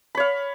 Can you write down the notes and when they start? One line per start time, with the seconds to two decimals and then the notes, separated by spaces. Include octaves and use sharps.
0.15 B5
0.17 C#5
0.20 F5